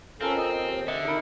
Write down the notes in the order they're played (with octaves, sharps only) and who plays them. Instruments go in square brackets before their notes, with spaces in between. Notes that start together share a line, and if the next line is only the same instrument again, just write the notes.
[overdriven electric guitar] C4 [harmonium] C#4 A4 [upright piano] F4 A#4
[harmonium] D#5
D#2
[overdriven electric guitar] D3 [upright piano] D#5 [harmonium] E5
[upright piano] D#4 A#4 B5